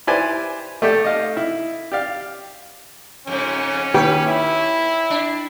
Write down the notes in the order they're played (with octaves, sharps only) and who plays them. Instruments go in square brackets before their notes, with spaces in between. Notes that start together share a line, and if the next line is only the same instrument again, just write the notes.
[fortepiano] E4 G4 B4 C5 D5 G#5
A3 G4 A4 D5 G5
D#5 F5
E4
G4 D5 F5
[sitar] F2 G#2 C#3 [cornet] C#4
[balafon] D#3 A#3 D#4 [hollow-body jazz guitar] G4 [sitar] B4 C#5
[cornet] E4
[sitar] D4